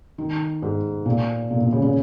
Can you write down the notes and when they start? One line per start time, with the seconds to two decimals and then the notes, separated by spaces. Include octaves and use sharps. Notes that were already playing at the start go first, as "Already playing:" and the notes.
0.18 D#3
0.62 G#2
1.06 A#2
1.51 A#2
1.61 A#2
1.72 C#3
1.83 C#3